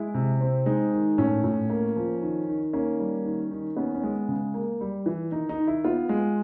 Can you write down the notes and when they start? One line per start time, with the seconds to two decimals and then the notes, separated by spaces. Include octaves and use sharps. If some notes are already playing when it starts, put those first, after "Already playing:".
Already playing: G#3 E4
0.14 C3
0.41 C4
0.66 G#3 D#4
0.92 D#3
1.18 A2 C#4
1.44 A2
1.70 A#3
1.97 F3
2.21 D#3
2.48 D#3
2.73 A#3 C#4
2.99 G3
3.25 D#3
3.51 D#3
3.77 B3 C#4
3.94 C#4
4.03 G#3
4.28 C#3
4.54 A#3
4.81 G3
5.06 E3
5.32 D#3 D#4
5.49 D#4
5.58 D#3
5.67 E4
5.84 B3 F4
6.09 G#3